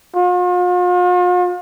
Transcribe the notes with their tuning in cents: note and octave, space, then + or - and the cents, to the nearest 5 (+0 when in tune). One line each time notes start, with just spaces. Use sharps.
F4 +45